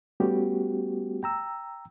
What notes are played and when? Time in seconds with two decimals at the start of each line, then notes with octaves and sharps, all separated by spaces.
0.20 G3 A3 B3 C#4 F#4 G4
1.23 G5 A#5 E6